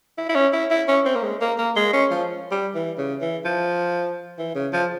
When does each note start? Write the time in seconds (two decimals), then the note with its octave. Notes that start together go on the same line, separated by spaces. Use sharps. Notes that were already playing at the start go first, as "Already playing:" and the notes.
0.18 E4
0.29 E4
0.35 C#4
0.53 E4
0.71 E4
0.88 C#4
1.05 C4
1.15 A#3
1.23 G#3
1.41 A#3
1.58 A#3
1.76 G#3
1.93 C#4
2.11 F3
2.51 G3
2.75 E3
2.98 C#3
3.21 E3
3.45 F3
4.39 E3
4.55 C#3
4.73 F3